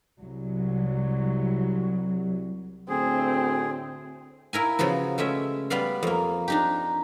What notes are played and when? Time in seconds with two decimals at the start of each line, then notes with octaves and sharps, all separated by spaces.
0.19 C2 F#3
2.89 D2 A2 C4 G#4
4.53 A#3 E4 A#4 G#5
4.79 C#3 F3 B3 F#4
5.18 G#3 A3 C#4 E5
5.70 G3 B3 B4 D5 F5
6.03 F2 A#3
6.48 D4 D#4 G4